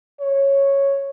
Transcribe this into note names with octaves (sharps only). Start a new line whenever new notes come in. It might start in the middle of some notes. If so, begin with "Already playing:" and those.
C#5